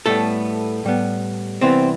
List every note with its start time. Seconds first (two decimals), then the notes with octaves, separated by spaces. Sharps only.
0.06 A2 G3 A3 B3 A4
0.85 A2 G3 B3
1.61 C2 C3 E3 B3 C4 C5